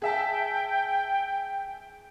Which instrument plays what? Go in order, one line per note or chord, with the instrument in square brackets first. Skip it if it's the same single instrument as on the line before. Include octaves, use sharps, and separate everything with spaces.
[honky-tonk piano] G#4 E5 A5 [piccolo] G5